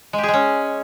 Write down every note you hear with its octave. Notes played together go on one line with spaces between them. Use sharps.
G#3
G4
G#4
G#3
C#4